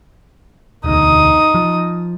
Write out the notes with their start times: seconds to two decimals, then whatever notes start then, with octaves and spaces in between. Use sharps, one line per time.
0.84 E1 D2 D#4 D#6
1.54 F3